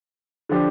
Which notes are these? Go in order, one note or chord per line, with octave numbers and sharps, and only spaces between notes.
D3 F3 D4 G4